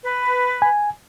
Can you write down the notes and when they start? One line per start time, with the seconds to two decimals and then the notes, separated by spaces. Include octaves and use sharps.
0.03 B4
0.62 G#5